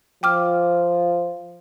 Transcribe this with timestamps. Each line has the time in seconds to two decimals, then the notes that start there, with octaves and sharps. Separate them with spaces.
0.23 F3 G5 D6 F6